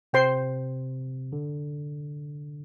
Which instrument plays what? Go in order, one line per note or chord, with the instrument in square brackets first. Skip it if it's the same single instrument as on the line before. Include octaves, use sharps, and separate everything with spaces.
[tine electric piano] C3 [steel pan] C5 G5 C6
[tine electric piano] D3